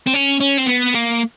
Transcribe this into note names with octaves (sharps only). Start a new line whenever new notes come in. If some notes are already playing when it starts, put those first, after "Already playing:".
C4
C#4
C#4
C4
B3
A#3